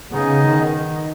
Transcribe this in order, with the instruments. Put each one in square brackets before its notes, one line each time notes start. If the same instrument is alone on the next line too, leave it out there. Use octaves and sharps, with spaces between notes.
[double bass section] C#3 [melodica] B3 D#4 G#4 D#5
[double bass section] D#3